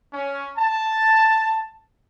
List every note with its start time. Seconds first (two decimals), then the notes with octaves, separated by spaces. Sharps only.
0.13 C#4
0.57 A5